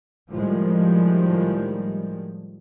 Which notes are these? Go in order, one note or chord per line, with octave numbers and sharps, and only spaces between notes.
A2 D#3 F3 G3 G#3